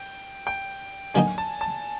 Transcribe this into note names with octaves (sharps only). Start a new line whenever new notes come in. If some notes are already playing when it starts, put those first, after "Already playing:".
Already playing: G5
G5
D3 F#3 A#3 D#4 G#5
A5
A5